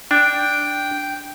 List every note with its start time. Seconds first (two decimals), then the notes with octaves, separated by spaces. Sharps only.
0.11 D4 G5